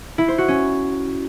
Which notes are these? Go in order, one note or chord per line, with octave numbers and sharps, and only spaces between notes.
E4
C5
F#4
C#4